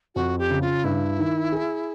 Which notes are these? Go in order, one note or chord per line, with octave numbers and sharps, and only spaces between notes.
F2 F#4
G4
C#3
F4
G2 E4
D#3
G#4